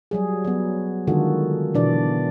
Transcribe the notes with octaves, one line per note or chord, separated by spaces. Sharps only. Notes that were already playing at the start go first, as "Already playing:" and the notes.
F#3 G3 G#4
F#3 B3
D3 D#3 G#3 F4 F#4 A4
B2 D3 E3 D4 D5